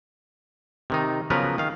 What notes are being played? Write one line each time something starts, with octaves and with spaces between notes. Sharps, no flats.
C3 D#3 D#4
C#3 F3 F#3 B3 A#4 B4
D#3 F5